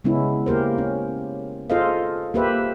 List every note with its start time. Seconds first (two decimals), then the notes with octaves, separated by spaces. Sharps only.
0.04 C#3 G#3 B3 C#4 E4
0.46 A#3 G4 A#4 C5
0.78 C#4
1.70 F4 G#4 A4 C5 D#5 F5
2.34 A#3 G4 B4 C5 E5